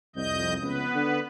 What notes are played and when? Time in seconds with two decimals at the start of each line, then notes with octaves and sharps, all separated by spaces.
0.16 C2 F2 D#5 G6
0.62 C#2 B3 B4
0.95 D3